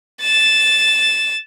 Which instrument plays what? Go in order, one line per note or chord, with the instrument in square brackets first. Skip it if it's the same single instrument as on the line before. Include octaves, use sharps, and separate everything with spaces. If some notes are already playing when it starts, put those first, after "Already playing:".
[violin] A6 E7